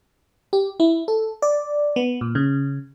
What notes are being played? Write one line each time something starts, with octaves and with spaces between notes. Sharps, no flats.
G4
E4
A4
D5
B3
A#2
C#3